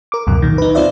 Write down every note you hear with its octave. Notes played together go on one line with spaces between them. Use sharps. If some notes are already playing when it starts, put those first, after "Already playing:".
A#4 D6
C#2 F#2 B2
A#2 D#3
D#4 B4
C4 F4 C5 D5 E5